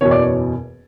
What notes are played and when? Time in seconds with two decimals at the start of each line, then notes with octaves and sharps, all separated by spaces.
0.01 F#1 E2 B2 C#5
0.11 D5
0.22 C#5